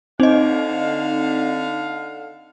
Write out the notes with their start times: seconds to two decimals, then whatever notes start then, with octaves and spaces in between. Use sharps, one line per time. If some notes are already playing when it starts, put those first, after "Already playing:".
0.20 D3 C4 D#4 D#5 F5